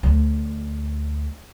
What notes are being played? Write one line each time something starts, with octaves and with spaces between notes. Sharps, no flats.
D2